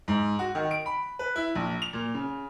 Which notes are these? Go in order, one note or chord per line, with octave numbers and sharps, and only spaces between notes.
G#2
F#4
D#3
D7
B5
B4
E4
A#1
F7
A#2
C#3